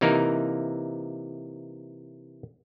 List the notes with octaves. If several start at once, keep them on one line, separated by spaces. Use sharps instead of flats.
C3 E3 A#3 D#4 A#4